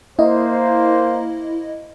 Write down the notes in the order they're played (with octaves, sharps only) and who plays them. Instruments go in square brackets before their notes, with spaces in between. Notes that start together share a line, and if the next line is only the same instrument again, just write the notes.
[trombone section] A#3 C5 [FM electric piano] E4 D#5